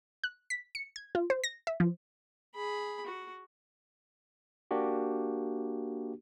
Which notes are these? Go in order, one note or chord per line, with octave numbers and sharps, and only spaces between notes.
F#6
B6
C#7
G#6
F4
C5
A#6
E5
F3
G#4 B5
F#4
A#3 D4 F#4 G4